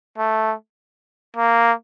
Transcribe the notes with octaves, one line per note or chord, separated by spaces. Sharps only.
A3
A#3